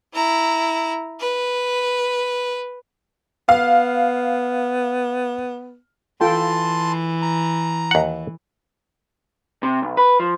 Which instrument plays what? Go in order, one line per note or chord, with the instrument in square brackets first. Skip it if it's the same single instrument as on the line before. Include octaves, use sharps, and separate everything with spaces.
[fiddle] E4 A#5
B4
[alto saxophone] B3 [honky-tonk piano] F5
[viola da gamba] E3 [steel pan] F4 A4 G5 [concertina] A5 C6
[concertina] A#5
[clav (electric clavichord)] D#2 F#5
[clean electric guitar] C3
B1
B4
F3